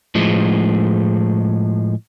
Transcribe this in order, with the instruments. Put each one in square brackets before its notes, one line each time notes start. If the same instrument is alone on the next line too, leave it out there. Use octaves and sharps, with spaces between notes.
[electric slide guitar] A2 F3 G#3